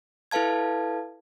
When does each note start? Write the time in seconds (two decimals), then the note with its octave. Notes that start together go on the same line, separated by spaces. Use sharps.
0.31 E4 A4 B4 F5 A5 G#6